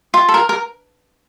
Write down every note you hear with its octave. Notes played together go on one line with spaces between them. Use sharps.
F4
A4
A#4
A#4